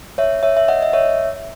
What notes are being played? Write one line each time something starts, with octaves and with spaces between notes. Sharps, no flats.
C#5 E5
C#5 E5
E5
D#5 F#5
D#5
C#5 E5